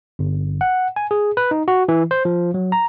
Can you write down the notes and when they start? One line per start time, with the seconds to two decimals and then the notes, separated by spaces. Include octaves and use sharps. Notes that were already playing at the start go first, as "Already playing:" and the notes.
0.19 G1
0.61 F#5
0.96 G#5
1.11 G#4
1.37 B4
1.51 D#4
1.68 F#4
1.89 E3
2.11 C5
2.25 F3
2.54 F#3
2.72 A#5